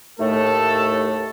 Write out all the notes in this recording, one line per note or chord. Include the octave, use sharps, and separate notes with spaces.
D#2 A2 A3 A4